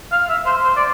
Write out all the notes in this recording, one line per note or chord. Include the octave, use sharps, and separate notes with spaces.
F5
E5
C5
C5
D5